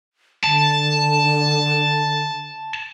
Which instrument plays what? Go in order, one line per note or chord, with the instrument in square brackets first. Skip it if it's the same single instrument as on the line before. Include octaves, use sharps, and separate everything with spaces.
[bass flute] D3 [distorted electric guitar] A5